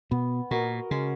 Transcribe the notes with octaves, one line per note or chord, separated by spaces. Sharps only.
B2 B3
A#2 F#4 A#4 D#5
C#3 G#3